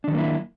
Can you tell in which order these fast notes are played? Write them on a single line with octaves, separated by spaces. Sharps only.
D4 D#3 F#3 A#3 E4